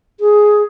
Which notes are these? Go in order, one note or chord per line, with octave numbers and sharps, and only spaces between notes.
G#4